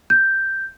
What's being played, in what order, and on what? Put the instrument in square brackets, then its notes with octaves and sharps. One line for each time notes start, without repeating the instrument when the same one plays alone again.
[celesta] G6